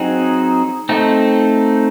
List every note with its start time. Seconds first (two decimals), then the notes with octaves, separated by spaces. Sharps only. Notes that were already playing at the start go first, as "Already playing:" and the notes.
Already playing: F#3 C4 D#4 G#4
0.89 A3 C4 D#4